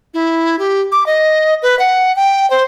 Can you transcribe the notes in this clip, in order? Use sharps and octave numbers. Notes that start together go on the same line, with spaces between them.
E4
G4
D6
D#5
B4
F#5
G5
C5